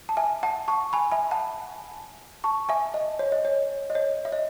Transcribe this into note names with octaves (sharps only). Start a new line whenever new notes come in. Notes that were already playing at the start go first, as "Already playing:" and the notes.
A5
E5 G#5
F#5 A5
A5 C#6
G#5 B5
E5 G#5
F#5 A5
A5 C#6
E5 G#5
D#5
C#5
D#5
C#5
D#5
C#5
E5
D#5